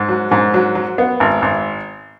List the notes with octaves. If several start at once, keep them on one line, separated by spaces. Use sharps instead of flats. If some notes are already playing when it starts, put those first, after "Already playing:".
Already playing: G#2
F#3
G#2
F#3
F#3
B3
G#1
G#1